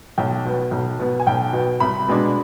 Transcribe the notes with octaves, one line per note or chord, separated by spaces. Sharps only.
B1 G5
B2 B3
B1
B2 B3
G#5
B1 G5
B2 B3
C2 B5
B2 G#3 D4